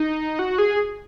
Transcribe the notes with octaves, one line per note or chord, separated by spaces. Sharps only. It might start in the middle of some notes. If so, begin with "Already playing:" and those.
Already playing: D#4
F#4
G#4